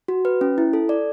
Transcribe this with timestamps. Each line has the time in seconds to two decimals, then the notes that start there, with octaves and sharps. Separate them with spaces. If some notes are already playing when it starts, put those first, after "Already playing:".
0.08 F#4
0.25 B4
0.41 C#4
0.58 E4
0.73 A4
0.89 D5